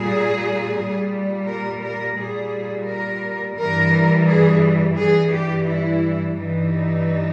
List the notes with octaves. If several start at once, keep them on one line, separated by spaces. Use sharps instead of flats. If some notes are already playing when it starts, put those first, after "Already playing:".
Already playing: A#2 G3 G#4
A#2 G3
A#4
A#4
A#2 G3 G#4
A#4
G2 E3 G3 A#4
G#4
G2 E3 G3 G#4
G4
E4
G2 E3 G3 D#4